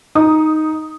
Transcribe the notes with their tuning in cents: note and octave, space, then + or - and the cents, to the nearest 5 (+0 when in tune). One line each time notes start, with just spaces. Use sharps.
D#4 +0 D#6 +0